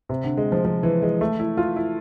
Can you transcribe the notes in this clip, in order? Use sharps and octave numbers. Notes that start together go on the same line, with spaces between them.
C3
D3
G#3
F3
F3
E3
G#3
A3
E4
F4
E4